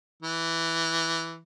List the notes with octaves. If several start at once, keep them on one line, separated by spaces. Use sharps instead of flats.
E3